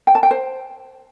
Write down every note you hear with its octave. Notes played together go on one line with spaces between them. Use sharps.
G5
A5
G5
C5